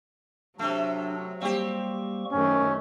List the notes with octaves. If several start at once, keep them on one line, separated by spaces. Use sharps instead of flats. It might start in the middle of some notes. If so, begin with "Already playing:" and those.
C3 F#3 A3 D4
G3 A#3 C4 G4 C#6
F#2 D#3 A3 C#4